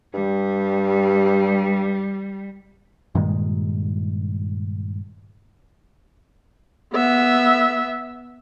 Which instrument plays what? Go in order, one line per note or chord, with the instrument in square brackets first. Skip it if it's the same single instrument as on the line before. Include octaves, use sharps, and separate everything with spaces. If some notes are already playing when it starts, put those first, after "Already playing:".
[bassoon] G2 [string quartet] G3
[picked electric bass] G2 A#2 D#3 G#3
[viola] B3 E5